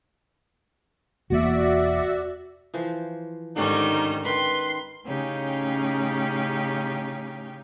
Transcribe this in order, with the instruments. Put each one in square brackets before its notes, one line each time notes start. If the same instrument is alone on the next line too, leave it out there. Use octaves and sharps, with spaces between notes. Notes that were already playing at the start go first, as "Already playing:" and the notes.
[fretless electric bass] E1 E2 A#3 [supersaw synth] F#4 D5 E5
[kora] E3 F3 C5
[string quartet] G#2 D#3 G3 [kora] D3 C#4 [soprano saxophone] D#4
[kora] D#3 G5 [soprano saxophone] B4 [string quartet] C6
[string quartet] A2 C#3 C#4 D#4 G4